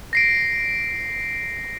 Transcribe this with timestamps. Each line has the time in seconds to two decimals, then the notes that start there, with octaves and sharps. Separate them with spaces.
0.13 A#6 C7 D7